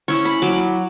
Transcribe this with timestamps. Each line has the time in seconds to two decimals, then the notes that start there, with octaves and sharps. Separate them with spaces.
0.08 C#4 E4 C#6
0.25 B5
0.42 F#3 D6